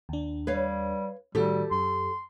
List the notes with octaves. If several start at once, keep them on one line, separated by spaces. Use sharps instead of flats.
D#2 D4
G3 B4 C#5 F5
A2 D#3 G3 F#4 G4 A4
F#2 C6